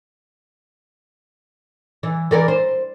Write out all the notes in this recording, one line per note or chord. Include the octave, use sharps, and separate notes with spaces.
E3
E3 A#4 D5
C5